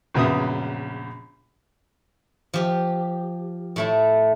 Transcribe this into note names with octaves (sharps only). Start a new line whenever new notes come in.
A#1 F#2 C#3 B3 E5 D#6
F3 G4
A2 A3 E4